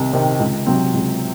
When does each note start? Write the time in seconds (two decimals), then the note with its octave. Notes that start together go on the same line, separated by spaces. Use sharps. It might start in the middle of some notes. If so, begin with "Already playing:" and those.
Already playing: C2 C3 D#3
0.13 C3 D#3
0.40 C#2
0.67 C3 F#3 C4
0.94 C#2